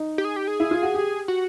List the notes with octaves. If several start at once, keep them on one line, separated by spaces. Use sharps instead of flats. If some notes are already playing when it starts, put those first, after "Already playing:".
Already playing: D#4
G4
G#4
G4
G#4
E4
F4
F#4
G4
F#4